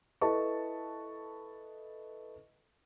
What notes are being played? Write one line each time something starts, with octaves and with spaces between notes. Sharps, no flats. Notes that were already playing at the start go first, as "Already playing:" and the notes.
E4 A4 B4 D#5 A5 C#6